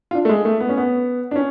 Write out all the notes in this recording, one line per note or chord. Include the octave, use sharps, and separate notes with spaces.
F4
D4
A3
G#3
A3
B3
C#4
B3
D4
C#4